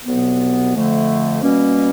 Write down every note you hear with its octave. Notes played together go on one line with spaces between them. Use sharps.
C2 B2 F#3 B3
F2 D3 F3 A3
B2 G3 A#3 C#4